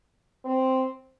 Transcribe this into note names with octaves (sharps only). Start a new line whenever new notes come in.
C4